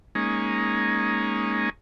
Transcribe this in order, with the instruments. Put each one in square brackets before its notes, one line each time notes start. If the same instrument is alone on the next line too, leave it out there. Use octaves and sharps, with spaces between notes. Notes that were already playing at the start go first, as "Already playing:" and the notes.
[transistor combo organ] G#3 A#3 C#4 D#4